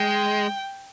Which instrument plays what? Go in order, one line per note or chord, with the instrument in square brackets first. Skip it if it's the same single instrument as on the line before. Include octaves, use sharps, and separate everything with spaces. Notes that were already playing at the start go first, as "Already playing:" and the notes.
Already playing: [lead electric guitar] G#3 [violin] G5